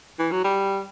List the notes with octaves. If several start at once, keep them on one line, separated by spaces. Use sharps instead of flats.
E3
F#3
G3